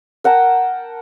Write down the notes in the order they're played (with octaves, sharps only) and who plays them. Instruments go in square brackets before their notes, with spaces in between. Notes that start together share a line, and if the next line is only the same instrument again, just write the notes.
[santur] A#4 F#5 G5 A5